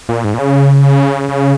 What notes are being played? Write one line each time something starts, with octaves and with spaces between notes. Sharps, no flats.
A#2
G#2
A#2
C#3
C#3